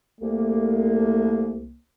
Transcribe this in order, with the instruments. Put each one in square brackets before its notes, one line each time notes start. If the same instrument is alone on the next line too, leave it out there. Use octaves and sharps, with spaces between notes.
[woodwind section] C2 A#3 [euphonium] A3